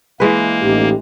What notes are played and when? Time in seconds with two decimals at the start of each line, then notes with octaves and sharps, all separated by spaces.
0.20 E3 G#3 A#3 B4
0.62 A1 D#4 G4